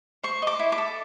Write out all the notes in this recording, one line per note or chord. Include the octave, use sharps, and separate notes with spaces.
C5 C#6
D#5 D6
E4
D6
A4